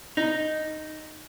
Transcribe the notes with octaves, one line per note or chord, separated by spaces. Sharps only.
D#4